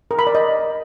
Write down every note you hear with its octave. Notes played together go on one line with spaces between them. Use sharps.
A#4
B5
D5
D#5